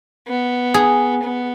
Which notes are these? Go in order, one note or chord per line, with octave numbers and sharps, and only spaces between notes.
B3
G#4
B3